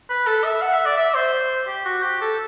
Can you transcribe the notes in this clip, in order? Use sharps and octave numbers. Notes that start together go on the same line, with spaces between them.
B4
A4
E5
F#5
E5
D5
E5
C5
G4
F#4
G4
A4